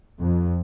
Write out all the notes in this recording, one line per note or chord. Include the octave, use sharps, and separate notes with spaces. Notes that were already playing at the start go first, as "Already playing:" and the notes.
F2